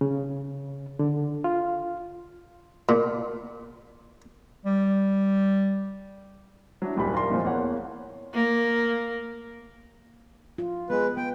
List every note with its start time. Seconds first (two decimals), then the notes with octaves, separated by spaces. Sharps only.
0.01 C#3
0.99 D3
1.44 F4
2.89 A#2
4.65 G3
6.82 F#3 D4 E4
6.96 F#1 D#2 A#2 G3 B5
7.13 F4 A#4 D5 C6
7.29 F1 A#2 F3
7.44 E2 A#3 C#5 F#5
8.34 A#3
10.58 F4
10.90 G#3 B3 B4
11.17 B3 G5